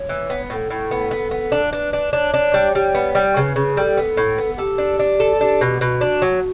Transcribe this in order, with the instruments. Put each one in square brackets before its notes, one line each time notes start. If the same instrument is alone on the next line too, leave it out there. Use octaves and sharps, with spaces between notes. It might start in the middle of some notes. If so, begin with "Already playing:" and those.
Already playing: [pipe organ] C#5
[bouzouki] E3
B3
[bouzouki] A2 [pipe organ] A4
[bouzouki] A2
B3
B3
B3
D4
[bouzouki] D4 [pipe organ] B4
[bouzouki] D4
[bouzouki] D4 [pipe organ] C#5
[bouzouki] D4
G3
G3
B3
G3
[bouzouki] C#3 [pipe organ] B4
[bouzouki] C#3
[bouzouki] G3 [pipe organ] A4
[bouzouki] B3
A2
B3
[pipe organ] G4 [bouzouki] A4
[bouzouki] D4
D4
A4
[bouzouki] D4 [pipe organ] G4
[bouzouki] B2
[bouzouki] B2 [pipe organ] F#4
[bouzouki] D4
F#3